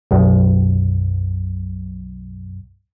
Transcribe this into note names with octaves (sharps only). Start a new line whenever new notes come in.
B1 F#2